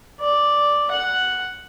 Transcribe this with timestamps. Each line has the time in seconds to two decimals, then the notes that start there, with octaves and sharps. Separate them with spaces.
0.20 D5
0.91 F#5